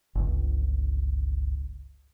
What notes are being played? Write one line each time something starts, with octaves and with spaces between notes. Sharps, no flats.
G1 C#2